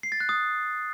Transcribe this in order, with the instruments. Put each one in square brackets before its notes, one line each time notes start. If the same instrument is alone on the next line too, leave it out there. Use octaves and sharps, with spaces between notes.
[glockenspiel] C7
A6
F#6
D#6